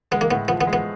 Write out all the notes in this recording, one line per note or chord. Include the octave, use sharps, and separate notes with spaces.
G#3 B3
A#3
A2 B3
F3 B3
B3
G#3
B3